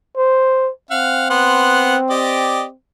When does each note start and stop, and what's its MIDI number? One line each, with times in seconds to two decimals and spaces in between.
0.17 0.70 72
0.91 2.75 60
0.91 1.28 77
0.91 1.28 78
1.30 1.96 59
1.30 1.96 78
1.30 1.96 84
2.10 2.64 67
2.10 2.64 74
2.10 2.64 75